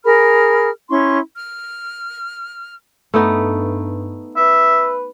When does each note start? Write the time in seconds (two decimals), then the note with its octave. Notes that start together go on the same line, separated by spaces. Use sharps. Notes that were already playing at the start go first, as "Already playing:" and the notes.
0.04 G#4 A#4 B5 F6
0.89 C#4 E4 C6 C#6
1.35 F6
3.14 G2 A3 B3 D#4
4.36 B4 E5